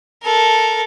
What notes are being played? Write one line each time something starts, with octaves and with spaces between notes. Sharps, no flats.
A4 A#4